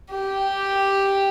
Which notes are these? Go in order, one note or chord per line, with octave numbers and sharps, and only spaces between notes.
G4